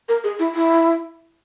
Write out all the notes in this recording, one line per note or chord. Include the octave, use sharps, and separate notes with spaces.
A#4
G#4
E4
E4